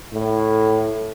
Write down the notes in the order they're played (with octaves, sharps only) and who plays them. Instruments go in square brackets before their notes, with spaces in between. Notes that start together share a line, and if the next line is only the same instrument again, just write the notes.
[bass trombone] A2